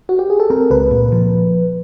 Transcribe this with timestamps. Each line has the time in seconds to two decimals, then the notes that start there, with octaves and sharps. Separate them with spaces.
0.09 F#4
0.19 G4
0.30 G#4
0.40 A4
0.50 C4 A#4
0.70 C#2 B4
0.91 A#2
1.12 F3